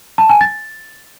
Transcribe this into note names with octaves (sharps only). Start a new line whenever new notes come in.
A5
G#5
A6